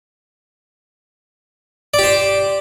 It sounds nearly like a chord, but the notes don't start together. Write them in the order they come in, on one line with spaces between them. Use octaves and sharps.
D5 G4 C5